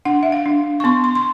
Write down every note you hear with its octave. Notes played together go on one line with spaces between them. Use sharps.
D4 F#5
E5
F5
D4
C#6
B3 C6
C6
C6